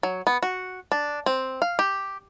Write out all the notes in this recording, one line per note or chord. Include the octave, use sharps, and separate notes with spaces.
F#3
B3
F#4
D4
C4
F5
G4